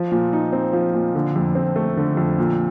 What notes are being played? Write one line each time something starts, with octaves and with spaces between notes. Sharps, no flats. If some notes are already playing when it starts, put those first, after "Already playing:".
Already playing: F3
A#2
D#4
C4
F3
A#2
D3
F2
C4
A3
D3
F2
A#2